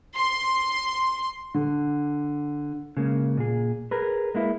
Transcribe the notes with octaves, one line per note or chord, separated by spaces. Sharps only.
C6
D3
C#3 G#3 A#3
A#2 G#4
G#4 A#4 B4
G#3 A#3 E4